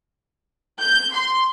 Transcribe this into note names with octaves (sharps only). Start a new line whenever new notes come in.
G6
C6